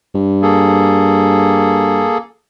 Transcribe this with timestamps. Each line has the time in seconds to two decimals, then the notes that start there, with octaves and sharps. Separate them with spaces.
0.15 G2
0.42 A#3 G#4 A4